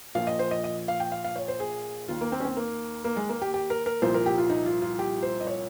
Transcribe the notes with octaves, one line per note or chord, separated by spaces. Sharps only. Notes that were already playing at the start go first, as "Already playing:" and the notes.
A#1 A#2 F3 F5
D#5
C5
D#5
D#5
F5
G5
F5
F5
C#5
C5
G#4
D#2 D#3 F4
A#3
C4
C#4
C4
A#3
A#3
G#3
A#3
G4
G4
A#4
A#4
C2 A#2 F3 C5
A#4
G4
F4
D#4
F4
F4
G4
C5
D#5
C#5